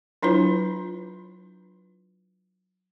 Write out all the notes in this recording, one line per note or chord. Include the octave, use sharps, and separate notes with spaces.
F#3 D4 E4 F4 B4